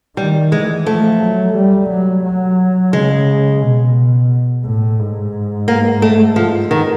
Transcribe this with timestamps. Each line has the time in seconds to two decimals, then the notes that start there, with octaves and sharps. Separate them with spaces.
0.17 D#3 G3
0.52 E3 G#3
0.86 F3 A3
1.20 F#3
1.55 G3
1.89 F#3
2.24 F#3
2.93 C#3 G#3
3.62 B2
4.65 A2
4.99 G#2
5.68 A#3
6.02 A3
6.36 F3
6.71 D#3